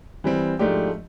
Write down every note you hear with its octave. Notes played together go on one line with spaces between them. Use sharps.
E3 G3 C4
G#2 F3 A3 D4 G4